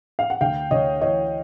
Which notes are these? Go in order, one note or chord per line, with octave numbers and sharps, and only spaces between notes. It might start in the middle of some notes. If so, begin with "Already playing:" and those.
F5
F#5
D2 F5 G5
D2 C#5 D#5
E3 C#5 D#5